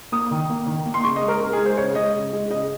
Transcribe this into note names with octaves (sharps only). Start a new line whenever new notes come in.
A#3 D#6
D#3
A#3
D#3
A#3
C6
C#3 C#6
D#5
G#3
A#4
C#3 A#4
G#4
G#3
C5
C#3 C#5
G#3 D#5
C#3
G#3
C#3 D#5